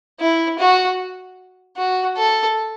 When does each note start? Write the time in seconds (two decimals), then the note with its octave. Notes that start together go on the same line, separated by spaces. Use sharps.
0.20 E4
0.59 F#4
1.77 F#4
2.17 A4